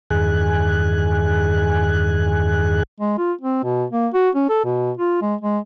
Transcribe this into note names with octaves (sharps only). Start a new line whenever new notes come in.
E2 G2 D#3 G#4 G#5 F#6
G#3
F4
C4
B2
A#3
F#4
C#4
A4
B2
F4
G#3
G#3